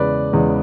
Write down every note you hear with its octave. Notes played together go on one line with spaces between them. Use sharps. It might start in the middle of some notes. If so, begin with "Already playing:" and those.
Already playing: E2 C#3 G#3 B4 D5
E2 C#3 G#3